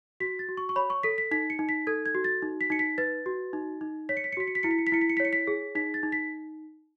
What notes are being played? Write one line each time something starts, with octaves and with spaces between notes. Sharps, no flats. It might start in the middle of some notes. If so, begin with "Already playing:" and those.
F#4 B6
A6
F#4
C#6
C#6
C#5 B5
C#6
A4 B6
B6
D#4 B6
C#7
D#4
B6
A4 G#6
G#6
F#4
A6
D#4
B6
D#4 C#7
B6
B4 A6
F#4
D#4
D#4
C#5 B6
C#7
B6
C#7
F#4 B6
C#7
B6
E4 C#7
B6
C#7
B6
E4 C#7
B6
C#7
B6
C#5
C#7
B6
G#4
D#4 B6
A6
D#4
B6